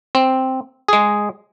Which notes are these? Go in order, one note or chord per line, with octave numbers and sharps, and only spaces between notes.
C4
G#3 G#4